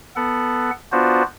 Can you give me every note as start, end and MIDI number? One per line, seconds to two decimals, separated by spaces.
0.16 0.71 59
0.16 0.71 69
0.16 0.71 78
0.92 1.23 59
0.92 1.23 62
0.92 1.23 65
0.92 1.23 66
0.92 1.23 72